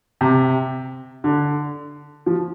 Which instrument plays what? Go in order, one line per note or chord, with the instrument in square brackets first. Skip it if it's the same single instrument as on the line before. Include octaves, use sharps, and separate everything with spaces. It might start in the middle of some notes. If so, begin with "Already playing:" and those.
[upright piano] C3
D3
F3